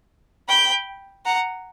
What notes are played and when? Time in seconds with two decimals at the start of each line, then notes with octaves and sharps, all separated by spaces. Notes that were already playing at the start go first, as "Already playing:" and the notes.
0.48 G5 B5
1.25 F#5 A#5